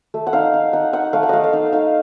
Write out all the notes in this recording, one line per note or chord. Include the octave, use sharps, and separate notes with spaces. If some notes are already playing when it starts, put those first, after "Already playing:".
A3
F#5
D#4 F5
D#4
D#4 F#5
D#4 F#5
A3 F5
F#5
A3 D#5 F5
F5
D#4
D#4 F5